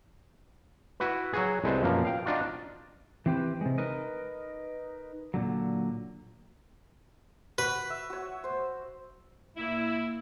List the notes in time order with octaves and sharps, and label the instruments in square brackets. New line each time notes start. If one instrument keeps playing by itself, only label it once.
[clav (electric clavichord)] E4 F#4 B4
F#3 F#4 G#4
C2 G#3 A4 B4 C5
F#2 B2 F3 A#3
F5 G5
D4 D#4 F4 F#4
[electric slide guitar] E3 C4 G4 B4
C3 G#3
D#4 A#4 B4 D#5
A#2 D3 F#3
[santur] F#4 B5 [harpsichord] B4
[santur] E5
F#4 C#5
C5
[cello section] A#2 A#3 [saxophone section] E4